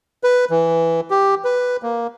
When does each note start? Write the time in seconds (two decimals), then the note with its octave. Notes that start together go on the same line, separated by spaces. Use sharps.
0.24 B4
0.50 E3
1.10 G4
1.44 B4
1.83 A#3